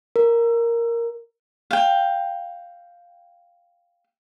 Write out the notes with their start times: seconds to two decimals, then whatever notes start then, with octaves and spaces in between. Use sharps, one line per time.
0.16 A#4
1.71 F5 G5